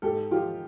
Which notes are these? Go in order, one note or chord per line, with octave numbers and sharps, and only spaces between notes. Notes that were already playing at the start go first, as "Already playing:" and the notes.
G#2 G4 A4
F3 F4 G4